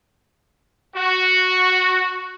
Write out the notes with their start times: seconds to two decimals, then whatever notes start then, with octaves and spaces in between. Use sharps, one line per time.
0.95 F#4